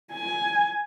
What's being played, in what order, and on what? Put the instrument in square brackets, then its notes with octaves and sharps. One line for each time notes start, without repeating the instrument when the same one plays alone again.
[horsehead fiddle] G#5